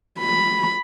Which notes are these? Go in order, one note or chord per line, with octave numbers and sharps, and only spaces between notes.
B5